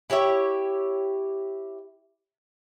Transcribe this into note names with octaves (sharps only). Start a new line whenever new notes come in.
E4 G4 C#5 E5